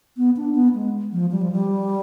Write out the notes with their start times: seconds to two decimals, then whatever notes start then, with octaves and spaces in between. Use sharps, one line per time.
0.17 B3
0.37 D4
0.55 B3
0.75 G#3
1.12 F3
1.31 G3
1.41 F3
1.52 G3